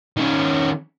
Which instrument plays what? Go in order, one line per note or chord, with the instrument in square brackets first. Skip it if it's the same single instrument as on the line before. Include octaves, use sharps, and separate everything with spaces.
[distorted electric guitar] D#3 C#4